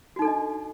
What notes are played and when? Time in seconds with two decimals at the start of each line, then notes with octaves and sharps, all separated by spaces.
0.16 F#4
0.19 D#4
0.22 A4
0.25 D4
0.28 D#5